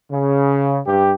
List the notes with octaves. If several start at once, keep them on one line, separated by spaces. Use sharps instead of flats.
C#3
G2 G4